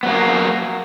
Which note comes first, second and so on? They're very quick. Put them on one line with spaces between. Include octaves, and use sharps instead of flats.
B3 F#3 A#3